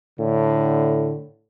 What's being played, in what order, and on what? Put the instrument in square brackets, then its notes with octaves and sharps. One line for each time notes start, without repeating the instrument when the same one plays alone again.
[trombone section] A2 D3